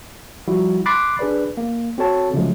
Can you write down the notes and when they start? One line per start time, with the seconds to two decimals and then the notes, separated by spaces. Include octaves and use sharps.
0.48 F3 G3 E4 F#4
0.86 B5 C6 D6 F#6 A6 C7
1.19 D4 G#4 B4 D5
1.57 A#3
1.98 C4 F#4 A4 C#5 A5
2.34 C#3 F3 F#3 G#3 A3